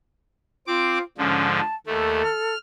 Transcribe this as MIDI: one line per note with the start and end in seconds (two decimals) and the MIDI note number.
0.67 0.98 60
0.67 1.02 65
0.67 0.98 86
1.18 1.60 44
1.18 1.60 50
1.18 1.60 53
1.18 1.45 61
1.55 1.75 81
1.87 2.22 39
1.87 2.22 57
1.87 2.55 69
2.24 2.58 89